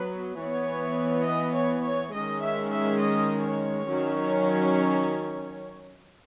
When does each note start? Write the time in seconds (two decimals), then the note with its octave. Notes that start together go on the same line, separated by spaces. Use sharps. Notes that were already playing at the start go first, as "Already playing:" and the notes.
Already playing: F#3 B3 B4
0.38 E3 B3 C#5
1.26 D#5
1.55 C#5
1.84 C#5
2.13 D#3 G#3 C#4 D#5
2.42 E5
2.70 E5
3.00 D#5
3.44 C#5
3.87 D#3 F#3 C#4